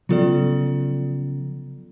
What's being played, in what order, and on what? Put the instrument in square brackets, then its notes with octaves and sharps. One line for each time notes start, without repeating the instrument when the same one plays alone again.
[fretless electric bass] C#3 F3 [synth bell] F#3 B3 F4 A4 D5